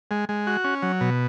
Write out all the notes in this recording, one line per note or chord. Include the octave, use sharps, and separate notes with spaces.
G#3
G#3
F#4
C#4
F#3
B2